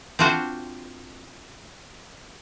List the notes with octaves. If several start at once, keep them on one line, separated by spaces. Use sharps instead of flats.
C4 D4 F4 F#4 C5